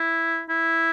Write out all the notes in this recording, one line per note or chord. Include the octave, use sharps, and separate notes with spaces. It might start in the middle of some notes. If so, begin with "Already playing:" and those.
Already playing: E4
E4